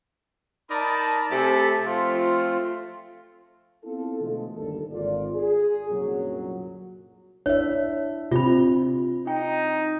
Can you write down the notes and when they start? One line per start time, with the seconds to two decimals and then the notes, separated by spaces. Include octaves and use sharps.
0.71 D#4 A#4 D5 A5 B5
1.30 C3 A3 G4 A4 G#5 A5
1.86 F3 A3 C4 F4
3.84 B3 C4 E4 F4 A4
4.20 B2 D3 E3 F3 G#3 A3
4.56 G1 D#2 D3 G3 A4
4.92 G#1 F4 D5
5.35 G#4
5.90 C2 F#2 A#2 D3 F#3
7.46 D4 E4 C#5 E5
8.31 C3 C4 F4 B5
9.27 D#4 G5